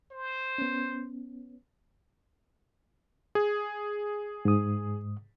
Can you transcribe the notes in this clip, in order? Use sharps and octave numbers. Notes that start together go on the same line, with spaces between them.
C5
B3 C#4
G#4
G#2 D#6